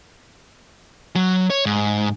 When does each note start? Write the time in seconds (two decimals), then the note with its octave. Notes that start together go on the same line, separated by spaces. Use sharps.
1.16 F#3
1.50 C#5
1.66 G#2